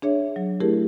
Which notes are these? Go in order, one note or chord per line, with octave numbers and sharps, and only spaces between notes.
D4 G#4 C#5 E5
F#3
A3 E4 G4 G#4 A#4